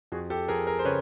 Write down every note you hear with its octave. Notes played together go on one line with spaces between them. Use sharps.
F2 F#4 G#4
G4 A4
F2 G#4 A#4
G#4 A#4
C5
C#3 B4 C#5